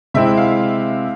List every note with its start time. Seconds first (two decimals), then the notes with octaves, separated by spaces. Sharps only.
0.14 C3 G#3 C4 E4 E5
0.37 F5